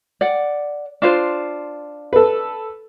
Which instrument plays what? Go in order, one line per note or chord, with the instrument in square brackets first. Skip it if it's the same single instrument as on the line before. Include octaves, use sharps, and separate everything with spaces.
[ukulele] D5 F#5
D4 F4 C5
[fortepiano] A4 B4